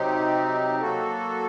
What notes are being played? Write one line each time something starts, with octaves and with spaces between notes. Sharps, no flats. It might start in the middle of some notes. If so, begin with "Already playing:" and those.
Already playing: C3 F#3 C4 D#4 G4
F#3 A#3 F#4 A4